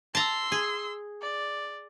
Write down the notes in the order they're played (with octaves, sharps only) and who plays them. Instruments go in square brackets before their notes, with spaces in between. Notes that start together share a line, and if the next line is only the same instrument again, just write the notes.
[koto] A5 A#5 [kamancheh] C6 E6
[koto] G#4
[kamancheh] D5